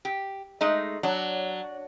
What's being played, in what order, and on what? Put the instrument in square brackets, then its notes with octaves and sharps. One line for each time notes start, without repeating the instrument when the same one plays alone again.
[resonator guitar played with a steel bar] G4
G#3 A3 D#4
[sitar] F#3 [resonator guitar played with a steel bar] D4